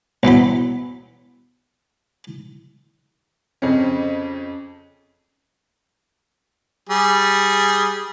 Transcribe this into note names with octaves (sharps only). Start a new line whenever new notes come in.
B1 E3 F#3 B5
F2 C#3 C4 C#4
G3 G#4